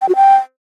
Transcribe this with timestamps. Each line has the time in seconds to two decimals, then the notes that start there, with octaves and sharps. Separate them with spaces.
0.02 G5
0.09 F#4
0.16 G5